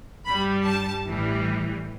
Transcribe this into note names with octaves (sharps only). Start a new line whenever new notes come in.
G2 G3 B5
A5
A1 A2 E3 G3